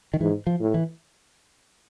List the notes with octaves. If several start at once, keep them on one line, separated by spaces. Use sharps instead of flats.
D#3
G#2 E3
F3
A2
E3